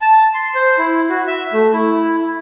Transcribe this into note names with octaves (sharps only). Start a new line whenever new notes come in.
A5
C6
C5
E4
F#4
E5
A3
E4